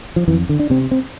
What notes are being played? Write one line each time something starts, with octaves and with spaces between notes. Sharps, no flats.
F3
F2 E3
D3
D4
C3 C4
C4